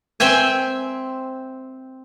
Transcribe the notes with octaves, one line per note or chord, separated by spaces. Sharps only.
C4 C5 E5 G5 G#5